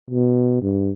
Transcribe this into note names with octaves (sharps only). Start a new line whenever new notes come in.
B2
G2